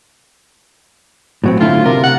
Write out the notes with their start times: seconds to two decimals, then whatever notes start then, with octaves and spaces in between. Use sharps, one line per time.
1.44 A2 F#3 C4
1.61 D3 A3 E4 F4
1.86 C3 A#4
2.04 F#5